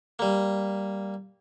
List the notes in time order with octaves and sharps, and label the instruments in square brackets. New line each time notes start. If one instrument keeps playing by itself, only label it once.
[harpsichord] G3 A#3